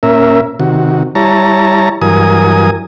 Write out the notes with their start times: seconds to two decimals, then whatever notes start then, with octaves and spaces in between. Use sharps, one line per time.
0.03 A#2 C#4 A#4 E5
0.60 C3 D#3 F#4
1.15 G3 E4 C#5 A5 A#5
2.02 G2 E3 F#3 A#4 G#5 D#6